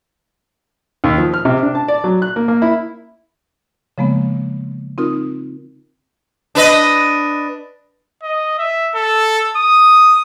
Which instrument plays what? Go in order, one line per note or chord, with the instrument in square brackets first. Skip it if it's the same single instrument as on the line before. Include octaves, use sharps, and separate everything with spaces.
[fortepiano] D#2
F3
F6
C3
D4
A5
D5
F#3
F#6
A#3
A#3
E4
[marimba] C#3 F3 G#3 A#3 B3
C4 D#4 F4 A#4 D#6
[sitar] D4 B4 D#5
[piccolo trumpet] D#5
E5
A4
D#6